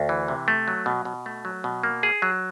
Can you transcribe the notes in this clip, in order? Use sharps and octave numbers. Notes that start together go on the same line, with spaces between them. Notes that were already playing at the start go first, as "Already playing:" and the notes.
Already playing: D2
E3
C3
A3
F#3
B2
B2
A3
F#3
B2
A#3
G#4
F#3